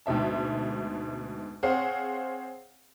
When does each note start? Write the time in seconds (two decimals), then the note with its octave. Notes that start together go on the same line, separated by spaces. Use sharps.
0.06 D2 G#2 B2 E5 A5
1.63 C4 G#4 C5 C#5 F5 F#5